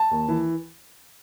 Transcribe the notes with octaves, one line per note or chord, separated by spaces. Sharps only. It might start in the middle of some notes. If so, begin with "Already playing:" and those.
Already playing: A5
D#2
E3